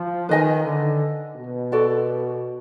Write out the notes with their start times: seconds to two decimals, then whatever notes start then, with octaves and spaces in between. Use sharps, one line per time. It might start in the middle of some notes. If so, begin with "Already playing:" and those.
Already playing: F3
0.29 D#3 B4 D#5 G#5
0.64 D3
1.36 B2
1.72 F#4 A4 D5